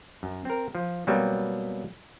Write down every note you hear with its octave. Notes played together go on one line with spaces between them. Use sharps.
F#2
C4 A#4
F3
B2 F#3 G3 A#3 C4